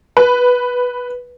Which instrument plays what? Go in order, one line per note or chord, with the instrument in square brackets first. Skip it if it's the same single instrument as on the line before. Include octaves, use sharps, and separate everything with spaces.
[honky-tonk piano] B4